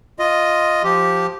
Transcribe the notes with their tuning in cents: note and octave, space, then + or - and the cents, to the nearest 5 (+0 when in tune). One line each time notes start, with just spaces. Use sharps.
F4 +0 D#5 +0
F3 +10 G4 -5